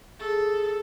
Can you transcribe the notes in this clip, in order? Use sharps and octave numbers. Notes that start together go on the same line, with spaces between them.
G#4 A4